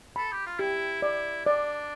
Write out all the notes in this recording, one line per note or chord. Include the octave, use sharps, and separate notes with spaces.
A4 B5
G4
F4
E4 G4
E4 D5
D4 D5